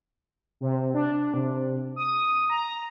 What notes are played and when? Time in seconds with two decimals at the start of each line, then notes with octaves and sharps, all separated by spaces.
0.60 C3
0.94 D4
1.34 C3
1.96 D#6
2.50 A#5